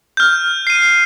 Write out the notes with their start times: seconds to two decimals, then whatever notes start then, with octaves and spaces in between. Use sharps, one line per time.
0.17 F6 G6
0.67 C7 D#7